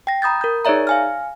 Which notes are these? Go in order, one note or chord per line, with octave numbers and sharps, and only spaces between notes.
G5 A#6
A#5 B5 D#6 G6 A6
A#4 G6
D#4 G#4 C#5 D5 E5 A#5
F5 G#5 F6